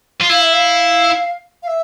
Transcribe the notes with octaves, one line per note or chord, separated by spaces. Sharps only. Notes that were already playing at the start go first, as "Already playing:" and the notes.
F4
E4 F5
E5
F5
F5
E5